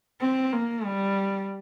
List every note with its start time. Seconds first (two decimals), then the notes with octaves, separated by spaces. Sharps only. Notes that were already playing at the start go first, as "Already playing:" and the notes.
0.21 C4
0.53 A#3
0.85 G3